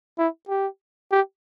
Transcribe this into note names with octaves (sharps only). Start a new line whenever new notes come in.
E4
G4
G4